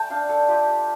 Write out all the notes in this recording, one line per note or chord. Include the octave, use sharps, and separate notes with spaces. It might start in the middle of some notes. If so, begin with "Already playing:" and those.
Already playing: A3 D5 G5 A5
D4 F5
A4
F4 G4